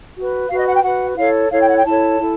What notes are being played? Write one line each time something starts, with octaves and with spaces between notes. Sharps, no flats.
F#4 B4
F#4 B4 F5
D#5
F#5
G5
F#4 B4 F#5
E4 A4 C#5 F5
E4 A4 C#5 F5
G5
F#5
G5
E4 A4 C#5 A5
E4 A4